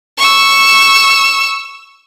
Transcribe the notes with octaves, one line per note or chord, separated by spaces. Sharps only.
C#6 E6